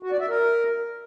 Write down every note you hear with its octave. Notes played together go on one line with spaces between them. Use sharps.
F#4
D5
E5
A#4